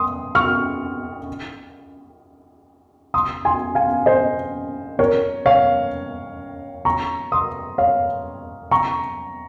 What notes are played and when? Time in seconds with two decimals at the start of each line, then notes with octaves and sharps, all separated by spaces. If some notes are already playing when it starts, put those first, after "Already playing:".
Already playing: C6 D#6
0.35 C#6 F6
3.14 C6 D#6
3.45 G#5 C6
3.75 F5 G#5
4.06 C5 D#5
4.99 A#4 C#5
5.46 C#5 F5
6.85 A#5 C#6
7.32 C6 D#6
7.78 C#5 F5
8.71 A#5 C#6